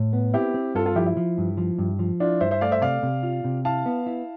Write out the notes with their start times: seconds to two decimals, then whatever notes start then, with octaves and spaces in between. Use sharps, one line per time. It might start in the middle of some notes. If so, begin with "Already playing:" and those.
Already playing: A2
0.13 B3
0.34 C4 E4 G4
0.54 C4
0.75 G2 F4 A4
0.86 F4 A4
0.96 F3 E4 G4
1.06 E4
1.17 F3
1.38 G2
1.57 F3
1.78 G2
1.99 F3
2.20 D4 E4 F4
2.41 G2 C5 E5
2.51 C5 E5
2.61 A3 D5 F5
2.71 C5 E5
2.82 C3 D5 F5
3.03 C3
3.23 F4
3.44 C3
3.65 E4 F5 A5
3.86 B3
4.06 E4